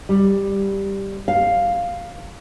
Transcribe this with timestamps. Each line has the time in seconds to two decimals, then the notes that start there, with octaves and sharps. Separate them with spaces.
0.09 G3
1.28 F5